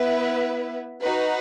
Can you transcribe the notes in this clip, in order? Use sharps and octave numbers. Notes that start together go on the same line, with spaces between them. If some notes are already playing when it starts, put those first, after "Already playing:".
Already playing: B3 E4 B4 E5
D#4 F#4 B4